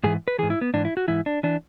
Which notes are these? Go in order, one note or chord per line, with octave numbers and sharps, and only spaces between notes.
G#2 E3 G#4
B4
G#2 E3 G#4
E4
B3
G#2 E3 D4
E4
F#4
G#2 E3 E4
D4
E3 D4